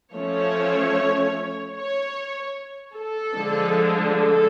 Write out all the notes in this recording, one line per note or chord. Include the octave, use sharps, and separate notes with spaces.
F3 A3 C#4 C#5
C#5
A4
D3 F3 G#3 D4
A4